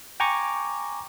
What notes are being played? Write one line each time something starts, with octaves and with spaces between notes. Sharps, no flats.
G5 G#5 A#5 C#6 D6